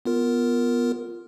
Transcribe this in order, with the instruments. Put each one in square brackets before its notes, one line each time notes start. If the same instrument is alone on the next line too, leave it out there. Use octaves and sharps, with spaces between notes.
[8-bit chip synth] B3 F4 A#4